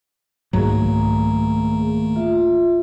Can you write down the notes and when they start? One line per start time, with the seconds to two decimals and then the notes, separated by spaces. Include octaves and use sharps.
0.53 C2 G#2 D#3 F#3 A3 A#3 G#4 A#5
2.16 F4 E5